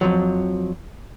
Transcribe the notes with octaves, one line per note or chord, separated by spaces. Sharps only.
F2 B2 F3 F#3